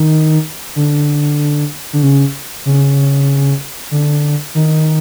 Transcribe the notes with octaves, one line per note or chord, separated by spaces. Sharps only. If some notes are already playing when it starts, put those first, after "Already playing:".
Already playing: D#3
D3
D3
C#3
C#3
D3
D#3